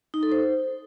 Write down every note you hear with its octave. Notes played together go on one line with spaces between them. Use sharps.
D#4
A4
C5